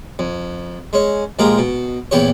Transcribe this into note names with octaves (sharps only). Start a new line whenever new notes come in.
F2
G#3 C#4
A#1 G#3 A#3 F4 G4 A#5
B2
A#1 E2 E3 G4 C#5